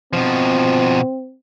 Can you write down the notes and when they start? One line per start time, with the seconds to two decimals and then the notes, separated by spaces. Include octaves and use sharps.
0.13 B2 F3 C4